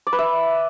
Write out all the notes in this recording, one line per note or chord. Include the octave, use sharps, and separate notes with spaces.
D5
B4
E5